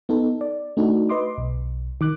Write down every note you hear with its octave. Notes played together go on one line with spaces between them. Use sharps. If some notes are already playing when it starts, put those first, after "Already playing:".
B3 D#4 A4
D5
A3 D4 D#4 F#4
B4 D#5 C6 D6
B1
D#3 D6 F#6